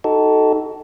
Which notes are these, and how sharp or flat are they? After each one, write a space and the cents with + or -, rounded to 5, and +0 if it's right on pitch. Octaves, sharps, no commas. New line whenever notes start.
D#4 +0 F#4 +40 A4 +0